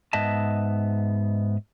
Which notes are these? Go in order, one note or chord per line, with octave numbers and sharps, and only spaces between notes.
G#2 B3 D#5 E5 A5